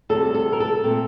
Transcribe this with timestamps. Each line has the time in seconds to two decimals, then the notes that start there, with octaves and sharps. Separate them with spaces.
0.09 D2 C3 G3 A4
0.35 A4
0.53 A#4
0.60 A4
0.84 A#2 A3 C4